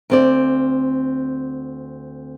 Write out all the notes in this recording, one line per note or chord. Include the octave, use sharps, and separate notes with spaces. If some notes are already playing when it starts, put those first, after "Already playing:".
D2 C4 D5